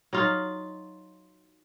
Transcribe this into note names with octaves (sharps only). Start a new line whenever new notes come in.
F#3 D#4 F4